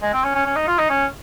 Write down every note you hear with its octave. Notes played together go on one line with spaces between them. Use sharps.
G#3
C4
C#4
C#4
C#4
D#4
F4
D#4
C#4